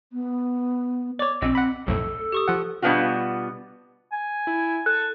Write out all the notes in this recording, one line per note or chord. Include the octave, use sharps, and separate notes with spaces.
B3
C#5 D5 D6
A#1 C4 D#5
F#5 B5
B1 F2 A2 A4
G4 C#6 D#6
F3 F#5
B2 G3 B3 D4 F4 F#4
G#5
E4
A4 F#6